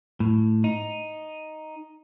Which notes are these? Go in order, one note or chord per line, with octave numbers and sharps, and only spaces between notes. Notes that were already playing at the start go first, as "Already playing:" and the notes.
A2
D#4